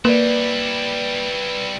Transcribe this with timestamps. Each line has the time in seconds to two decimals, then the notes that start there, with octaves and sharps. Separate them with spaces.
0.05 G3 A#3 E4 B4 D5